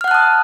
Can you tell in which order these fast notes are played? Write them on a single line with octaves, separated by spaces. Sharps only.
F6 F#5 F#6 A5 D#6